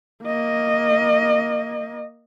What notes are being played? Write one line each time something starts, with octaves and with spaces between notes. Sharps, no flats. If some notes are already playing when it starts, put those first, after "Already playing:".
A#3 D#5